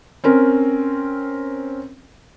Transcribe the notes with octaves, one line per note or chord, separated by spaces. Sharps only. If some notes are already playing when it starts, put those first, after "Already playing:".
C4 C#4 A#4